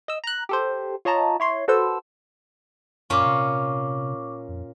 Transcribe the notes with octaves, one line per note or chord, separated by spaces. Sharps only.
D#5 E6
A#5 F#6
G4 A4 C5
F4 C#5 D#5 A5 A#5
E4 C#5 C6
F#4 A4 B4 C5 E6
F#2 A#2 C#4 F4 C#6 D6
C3
F2